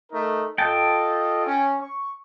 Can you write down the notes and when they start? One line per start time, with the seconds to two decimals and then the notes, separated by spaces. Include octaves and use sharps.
0.12 A3 D#4 A#4
0.58 F4 A4 D#5 G5 A5
1.46 C#4
1.81 C#6